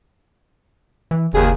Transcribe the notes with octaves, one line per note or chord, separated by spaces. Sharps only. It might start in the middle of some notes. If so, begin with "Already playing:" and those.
E3
F#1 D#2 G#4